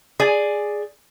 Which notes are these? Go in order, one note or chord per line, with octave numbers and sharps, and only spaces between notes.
G#4 D5 G#5